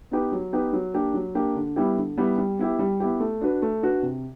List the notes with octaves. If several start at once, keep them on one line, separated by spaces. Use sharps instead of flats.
B3 D#4 G4 B4
F#3
B3 D#4 G4 B4
F#3
A#3 D4 G4
F#3
A#3 D4 G4
D3
G3 B3 E4 G4
D3
G3 B3 E4 G4
G3
B3 E4 G4
G3
B3 E4 G4
A3
D4 F#4 B4
A3
D4 F#4 B4
C3